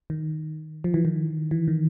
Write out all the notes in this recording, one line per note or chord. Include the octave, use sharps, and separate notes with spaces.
D#3
F3
E3
D#3
E3
D#3